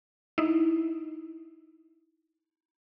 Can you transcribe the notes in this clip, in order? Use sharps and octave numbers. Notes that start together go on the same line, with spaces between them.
D#4 E4